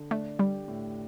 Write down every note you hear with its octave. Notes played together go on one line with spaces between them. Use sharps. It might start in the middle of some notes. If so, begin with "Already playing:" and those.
Already playing: D3
A3 D4
G3 G4
A2